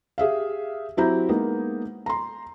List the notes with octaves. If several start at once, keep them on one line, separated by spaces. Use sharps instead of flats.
G4 G#4 E5 F5
F#3 C4 E4 G4 A#5 G6
G#3 A#3 B3 D#4
A#5 C6